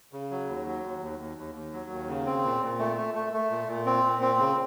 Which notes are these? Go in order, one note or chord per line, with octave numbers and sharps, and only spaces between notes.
C#3
F#3
D#2
F#3
D#2
D#2
D#2
D#2
D#2
F#3
D#2
C#3
C4
A#2
A#2
A3
A3
A3
A3
A#2
A#2
C4
A#2
C4
C#3